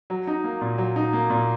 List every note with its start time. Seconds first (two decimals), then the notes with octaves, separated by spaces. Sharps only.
0.10 F#3
0.27 D#4
0.44 A#3
0.61 A#2
0.78 F#3
0.96 D#4
1.13 A#3
1.30 A#2